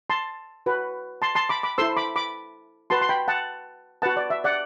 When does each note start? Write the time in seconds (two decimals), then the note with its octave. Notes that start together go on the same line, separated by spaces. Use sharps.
0.10 A5 C6
0.66 F#4 B4
1.22 A5 C6
1.35 A5 C6
1.49 B5 D6
1.63 B5 D6
1.78 E4 A4 C5 C6 E6
1.97 B5 D6
2.16 B5 D6
2.90 F#4 B4 A5 C6
3.02 C6
3.09 G5 B5
3.28 F#5 A5
4.02 F#4 B4 F#5 A5
4.17 D5
4.30 E5
4.44 D5 F#5